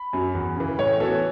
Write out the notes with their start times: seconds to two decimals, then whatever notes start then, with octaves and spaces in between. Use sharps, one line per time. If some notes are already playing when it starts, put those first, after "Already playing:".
Already playing: B5
0.13 F#2 F#3
0.34 E2
0.57 C#3 E3
0.79 A2 C#5
1.00 E3 B3 F#4 A4